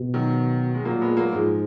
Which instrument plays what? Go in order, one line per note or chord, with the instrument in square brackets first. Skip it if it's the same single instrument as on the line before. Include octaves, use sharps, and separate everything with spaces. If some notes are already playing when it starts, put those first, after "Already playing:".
Already playing: [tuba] B2
[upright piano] D#3 F#3
G#3
[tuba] A#2 [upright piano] F#3 A#3
[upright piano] G#3 B3
F#3 A#3
[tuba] G#2 [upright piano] F3 G#3